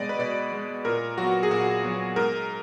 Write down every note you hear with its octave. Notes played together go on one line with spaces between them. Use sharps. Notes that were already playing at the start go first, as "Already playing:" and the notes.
Already playing: B2 G#3 B3 D5 D#5
B4
B2 D5
G#3 B3
A#2 A#4
F#3 B3 F#4
G#4
A#2 F#4
F#3 B3
G#2 A#4